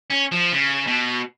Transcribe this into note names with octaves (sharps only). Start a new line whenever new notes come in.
C#4
F3
C#3
B2